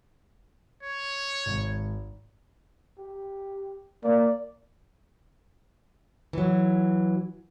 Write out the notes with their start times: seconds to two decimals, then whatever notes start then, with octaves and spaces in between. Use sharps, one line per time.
0.83 C#5
1.46 G#1
2.98 G4
4.04 A#3 D5
6.33 E3 F#3